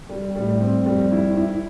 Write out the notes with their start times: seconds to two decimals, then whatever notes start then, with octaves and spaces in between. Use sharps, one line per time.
0.09 G3
0.36 A2 G3
0.61 C4
0.86 F2 G3
1.12 E4
1.37 E4